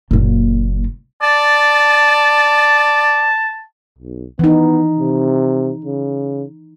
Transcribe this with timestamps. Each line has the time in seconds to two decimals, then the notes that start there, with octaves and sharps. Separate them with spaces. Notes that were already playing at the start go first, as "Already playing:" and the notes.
0.11 F#1 A#2
1.22 D5 A5
3.98 B1
4.39 E3 B3 D#4
4.99 C3
5.85 C#3